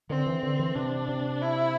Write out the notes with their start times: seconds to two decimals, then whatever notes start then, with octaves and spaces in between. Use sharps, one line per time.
0.09 D3 C4
0.26 E3
0.43 D3
0.59 E3
0.75 C3 D4
1.08 C3
1.42 E4